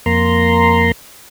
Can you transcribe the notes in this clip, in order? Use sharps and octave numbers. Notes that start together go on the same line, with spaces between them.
F2 A#3 A#5 C6